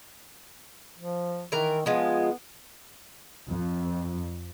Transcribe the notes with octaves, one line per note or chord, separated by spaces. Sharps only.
F3
D#3 E3 A#4
F3 G#3 B3 F4
F2